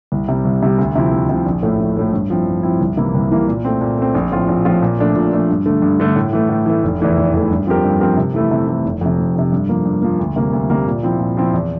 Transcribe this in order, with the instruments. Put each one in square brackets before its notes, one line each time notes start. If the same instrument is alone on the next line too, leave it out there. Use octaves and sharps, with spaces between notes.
[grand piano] C2
C3 G3
C2
C3 G3
D2
C3 F3 C4 E4
D2
C3 F3 C4 E4
A#1
A2 F3 A3 E4
A#1
A2 F3 A3 E4
G2
F3 C4 E4
G2
F3 C4 E4
C2
C3 E3 A#3 E4
C2
C3 E3 A#3 E4
A#2
A3 C4
A#2
A3 C4
A#1
A2 F3 C4 F4
A#1
A2 F3 C4 F4
A#2
F3 A3 D4
A#2
F3 A3 D4
G2
D3 A3
G2
D3 A3
A2
E3 A3
A2
E3 A3
F1
E2 E3 A3
F1
E2 E3 A3
G2
F3 C4 G4 A#4
G2
F3 C4 G4 A#4
C3
E3 A3 E4
C3
E3 A3 E4
F1
F2 C3
F1
F2 C3
G2
F3 A#3
G2
F3 A#3
D2
C3 G3 A#3
D2
C3 G3 A#3
A#2
F3 C4 E4
A#2
F3 C4 E4
E2